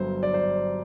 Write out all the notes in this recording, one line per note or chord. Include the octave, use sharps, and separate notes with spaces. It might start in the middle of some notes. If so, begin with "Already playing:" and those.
Already playing: G1 G2 F#3 C5
D5
C5